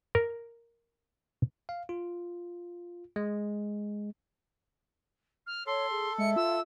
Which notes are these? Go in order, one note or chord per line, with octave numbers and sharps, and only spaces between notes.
A#4
F5
F4
G#3
F6
A4 C#5 C6
G#4
G#3 E5 C#7
F4 E6